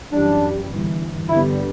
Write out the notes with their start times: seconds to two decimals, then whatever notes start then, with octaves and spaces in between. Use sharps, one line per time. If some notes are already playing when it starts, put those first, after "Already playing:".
0.11 F#2 E3 G3 D4
0.70 G1 G2 E3
1.29 G1 G2 D3 G3 B3 E4